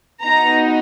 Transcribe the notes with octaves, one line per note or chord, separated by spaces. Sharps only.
B3 D#4 F#4 A#5